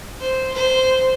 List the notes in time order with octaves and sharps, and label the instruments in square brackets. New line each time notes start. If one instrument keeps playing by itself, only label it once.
[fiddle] C5
C5